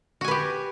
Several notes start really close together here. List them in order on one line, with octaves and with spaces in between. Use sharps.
F#4 G#5 B4 G4